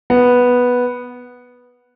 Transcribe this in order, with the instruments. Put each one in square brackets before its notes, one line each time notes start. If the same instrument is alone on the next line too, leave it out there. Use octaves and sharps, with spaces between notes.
[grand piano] B3